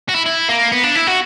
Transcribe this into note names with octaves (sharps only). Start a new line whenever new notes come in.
F#4
E4
E4
A#3
B3
D4
E4
F#4